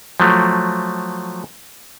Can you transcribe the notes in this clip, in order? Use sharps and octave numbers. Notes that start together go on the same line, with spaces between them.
F3 F#3 A3